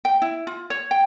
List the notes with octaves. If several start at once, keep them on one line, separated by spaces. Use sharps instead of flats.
G5
E4
F4
C#5
G5